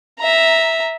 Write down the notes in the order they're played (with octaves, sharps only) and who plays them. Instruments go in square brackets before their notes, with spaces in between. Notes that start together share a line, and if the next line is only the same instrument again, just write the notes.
[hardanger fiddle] E5 A#5